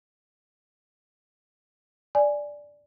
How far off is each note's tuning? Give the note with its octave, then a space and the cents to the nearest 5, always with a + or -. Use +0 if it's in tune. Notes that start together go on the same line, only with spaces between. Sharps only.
D5 +0 G#5 +0